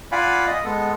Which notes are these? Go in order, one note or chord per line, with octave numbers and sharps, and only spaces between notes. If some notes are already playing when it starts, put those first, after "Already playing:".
F4 D5 F5 F#5 G#5 B5
D#5
G#3 B3 A4